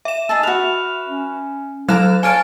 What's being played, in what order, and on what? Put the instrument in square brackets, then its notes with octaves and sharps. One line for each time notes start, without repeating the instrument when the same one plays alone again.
[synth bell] E5 E7
[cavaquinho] D#4 G#4 A5 [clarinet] E6
[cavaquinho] F#4 B4 [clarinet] F6
[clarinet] C#4
[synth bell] F#3 F#6 E7 [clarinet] A4 [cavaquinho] F5 A#5 D6
[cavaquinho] C#5 D5 A5 [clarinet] F5 [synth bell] G#5 F6 D7